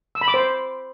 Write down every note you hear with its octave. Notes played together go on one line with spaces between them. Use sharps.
E6
B5
D6
C5